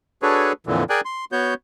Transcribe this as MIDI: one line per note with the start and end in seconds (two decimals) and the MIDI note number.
0.22 0.53 62
0.22 0.53 66
0.22 0.53 68
0.22 0.53 69
0.22 0.53 71
0.22 0.53 73
0.67 0.84 41
0.67 0.84 46
0.67 0.84 50
0.67 0.84 52
0.90 1.01 68
0.90 1.01 70
0.90 1.01 74
0.90 1.01 79
0.90 1.01 80
0.90 1.01 90
1.05 1.25 84
1.32 1.54 59
1.32 1.54 66
1.32 1.54 73
1.32 1.54 91